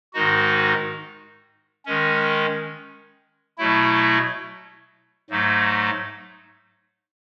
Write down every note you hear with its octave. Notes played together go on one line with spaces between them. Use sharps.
G#2 D#3 G#3 D#4 F#4
D#3 G#3 C#4
B2 F#3 A3 E4
G#2 F#3 A3